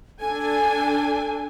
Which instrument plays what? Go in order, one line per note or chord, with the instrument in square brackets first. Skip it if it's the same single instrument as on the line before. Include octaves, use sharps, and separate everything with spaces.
[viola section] D4 G#5 [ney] A4